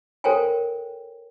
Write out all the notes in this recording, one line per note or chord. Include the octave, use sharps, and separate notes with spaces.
A4 A#4 C5 C#5 G5 G#5